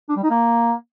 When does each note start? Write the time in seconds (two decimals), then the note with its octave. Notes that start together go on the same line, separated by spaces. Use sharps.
0.09 D4
0.16 G3
0.23 D#4
0.30 A#3